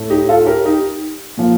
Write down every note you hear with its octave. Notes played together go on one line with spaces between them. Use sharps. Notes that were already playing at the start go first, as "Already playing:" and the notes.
Already playing: A2 A3
D#4 G4
F4 A4
G4 A#4
D#4 G4
A#2 F3 A#3